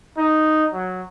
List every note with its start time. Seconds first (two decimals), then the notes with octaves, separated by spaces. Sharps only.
0.17 D#4
0.73 F#3